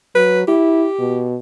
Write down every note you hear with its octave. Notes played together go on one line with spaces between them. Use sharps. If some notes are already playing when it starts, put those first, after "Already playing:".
F#3 B4
E4 G4
B2